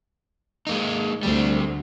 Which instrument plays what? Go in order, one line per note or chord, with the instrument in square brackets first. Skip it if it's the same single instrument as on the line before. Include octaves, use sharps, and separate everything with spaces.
[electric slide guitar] G#3 A#3 D#4
[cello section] D2 [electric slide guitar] G3 C4